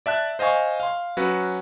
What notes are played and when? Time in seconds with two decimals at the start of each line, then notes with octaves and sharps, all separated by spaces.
0.06 D5 E5 A5 F#6
0.39 C5 D#5 F5 G#5 C#6
0.80 F5 C6
1.17 F#3 C#4 F#4 B4